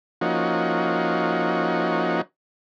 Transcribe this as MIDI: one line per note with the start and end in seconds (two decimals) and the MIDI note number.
0.21 2.21 53
0.21 2.21 58
0.21 2.21 61
0.21 2.21 63
0.21 2.21 66